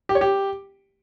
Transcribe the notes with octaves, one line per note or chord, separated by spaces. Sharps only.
G4
C#5
G4